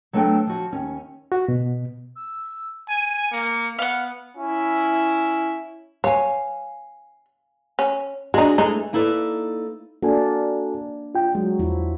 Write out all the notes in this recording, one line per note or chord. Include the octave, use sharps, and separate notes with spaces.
F#3 A3 B3 D4 A4 G5
F3 F#4
D#2 C#4
F#4
B2
E6
G#5 D#7
A#3 C#7
B3 F5 F#5 C#7
C#4 E4
C#5 F5 G#5
C#4
G#3 D4 D#4 F#4
E3 G#3 A3 D#4
A#3 D#4 E4 A4 B4 D5
A#3 D4 F#4 A4 G#5
F4 G5
F#3 G#3
E2 F3 E4